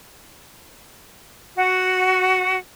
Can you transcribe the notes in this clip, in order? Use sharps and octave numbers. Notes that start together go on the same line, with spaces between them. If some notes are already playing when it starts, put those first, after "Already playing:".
F#4